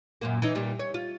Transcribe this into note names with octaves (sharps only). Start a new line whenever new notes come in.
F#2 A#2 A#3
E3 C#4 D#4
A#2 D#3 G3
C#5
F4